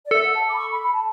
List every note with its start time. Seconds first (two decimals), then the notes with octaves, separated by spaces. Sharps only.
0.05 D5
0.11 A4 E5
0.23 F#5
0.34 A5
0.47 D6
0.54 B5
0.58 C#6
0.70 B5
0.82 B5
0.93 A5